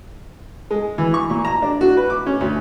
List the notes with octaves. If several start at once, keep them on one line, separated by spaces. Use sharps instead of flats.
G#3
E3
C#6
A#2
A#5
D4
F#4
B4
D6
C#4
D2